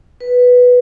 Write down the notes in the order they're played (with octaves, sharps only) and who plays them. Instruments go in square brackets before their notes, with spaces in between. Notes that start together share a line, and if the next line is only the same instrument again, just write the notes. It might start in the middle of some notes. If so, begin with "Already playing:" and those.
[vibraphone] B4